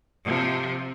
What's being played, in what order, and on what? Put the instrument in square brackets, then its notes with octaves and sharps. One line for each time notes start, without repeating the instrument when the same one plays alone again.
[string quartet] C3 F3